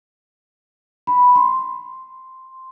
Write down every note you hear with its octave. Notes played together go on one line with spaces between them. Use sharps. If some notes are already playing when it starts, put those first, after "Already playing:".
B5
C6